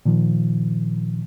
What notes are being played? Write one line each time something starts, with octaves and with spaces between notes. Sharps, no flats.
A#2 D#3 F3